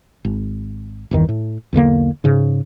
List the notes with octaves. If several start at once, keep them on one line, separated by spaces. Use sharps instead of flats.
G#1
G1 E2 D#3 E3
A2
B1 E2 D3 A#3
G#2 C#3